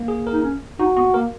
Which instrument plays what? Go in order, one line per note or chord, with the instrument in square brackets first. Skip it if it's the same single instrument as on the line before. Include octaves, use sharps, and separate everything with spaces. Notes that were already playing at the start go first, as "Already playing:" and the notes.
Already playing: [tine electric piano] A#3
G#4
A#4
[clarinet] D#4
C#4
[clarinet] D#4 [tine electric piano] F#4
[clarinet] B3 [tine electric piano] F#4
[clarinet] A#3 [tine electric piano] A#4